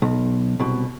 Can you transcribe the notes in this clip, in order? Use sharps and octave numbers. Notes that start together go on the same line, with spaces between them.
B1
C2 B2